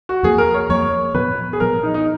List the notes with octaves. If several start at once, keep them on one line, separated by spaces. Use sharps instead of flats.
F#4
F2 F3 A#3 G#4
A#4
C#5
F2 F3 A#3 C#5
A#2 F3 B3 B4
G#4
A#2 F3 B3 A#4
D#4
D#4